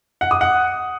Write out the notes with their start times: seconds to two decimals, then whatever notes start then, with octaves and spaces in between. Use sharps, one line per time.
0.21 F#5
0.31 D#6
0.41 F#5